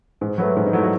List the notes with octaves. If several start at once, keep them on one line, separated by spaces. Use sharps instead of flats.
G#2
F#3 A3 B4
G#2
D#4
F#3 A3 E4
F#4